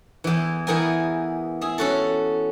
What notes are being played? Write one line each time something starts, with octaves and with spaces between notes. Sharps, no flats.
E2 E3
E3 B3 G#4 A#4 G5 G#5
G#4 E5
C#4 F#4 A4